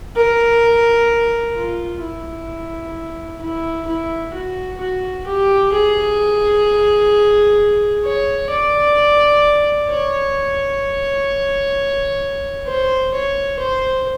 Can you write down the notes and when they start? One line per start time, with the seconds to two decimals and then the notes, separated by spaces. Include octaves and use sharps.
0.17 A#4
1.56 F4
2.03 E4
3.42 E4
3.87 E4
4.34 F#4
4.81 F#4
5.27 G4
5.72 G#4
8.04 C#5
8.50 D5
9.89 C#5
12.66 C5
13.14 C#5
13.59 C5